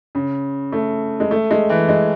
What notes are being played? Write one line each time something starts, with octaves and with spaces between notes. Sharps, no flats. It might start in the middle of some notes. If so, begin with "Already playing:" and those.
C#3
A3
G#3
A3
G#3
E3
G#3